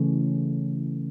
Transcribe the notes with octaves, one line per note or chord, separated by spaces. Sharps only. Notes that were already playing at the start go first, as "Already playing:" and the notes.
Already playing: C#3 E3 A3 C#4